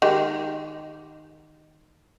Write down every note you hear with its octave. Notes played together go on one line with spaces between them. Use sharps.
D#3 G#3 G4